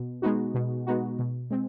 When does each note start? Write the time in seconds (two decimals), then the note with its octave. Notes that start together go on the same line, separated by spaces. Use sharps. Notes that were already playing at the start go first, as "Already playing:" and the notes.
Already playing: B2
0.22 G#3 B3 D#4 F#4
0.54 B2
0.87 G#3 B3 D#4 F#4
1.19 B2
1.51 G#3 C4